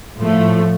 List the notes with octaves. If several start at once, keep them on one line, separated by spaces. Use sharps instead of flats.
A2 F3 A3